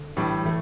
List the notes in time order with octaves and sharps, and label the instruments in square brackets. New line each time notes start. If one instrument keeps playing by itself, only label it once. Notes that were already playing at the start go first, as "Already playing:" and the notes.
Already playing: [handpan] D3
[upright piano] A2 E3 G3 D4
[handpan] E3 [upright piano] A3